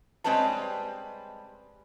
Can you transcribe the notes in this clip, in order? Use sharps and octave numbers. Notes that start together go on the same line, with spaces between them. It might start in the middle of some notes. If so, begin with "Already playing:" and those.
G3 G#3 C4 B4 C#5 A5